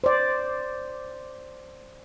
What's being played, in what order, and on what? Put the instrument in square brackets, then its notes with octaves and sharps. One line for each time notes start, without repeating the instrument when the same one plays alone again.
[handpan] C5 D5